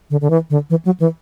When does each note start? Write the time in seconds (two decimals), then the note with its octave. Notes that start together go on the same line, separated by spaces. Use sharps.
0.10 D3
0.21 D3
0.30 E3
0.50 D3
0.70 E3
0.85 F#3
1.00 E3